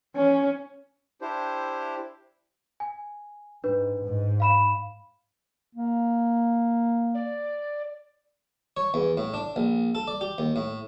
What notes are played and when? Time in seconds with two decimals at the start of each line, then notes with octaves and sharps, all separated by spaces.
0.16 C#4
1.21 D4 E4 G4 C5
2.80 G#5
3.64 G#2 D4 B4
4.05 G#2
4.40 F5 B5 E7
5.75 A#3
7.15 D5
8.77 C#5
8.94 E2
9.17 A2
9.34 D4
9.56 A#1
9.95 A4
10.08 D5
10.21 G4
10.38 D#2
10.56 A2